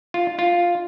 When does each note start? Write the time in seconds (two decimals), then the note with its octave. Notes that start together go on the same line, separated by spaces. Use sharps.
0.14 F4
0.39 F4